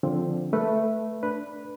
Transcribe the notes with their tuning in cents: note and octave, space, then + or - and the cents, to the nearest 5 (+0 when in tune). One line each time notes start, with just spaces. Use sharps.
D3 +0 F3 +0 C4 +0
A3 +0 B4 -5
D4 +0 B4 +0